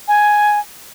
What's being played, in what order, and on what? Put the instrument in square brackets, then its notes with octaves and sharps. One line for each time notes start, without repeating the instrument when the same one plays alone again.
[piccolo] G#5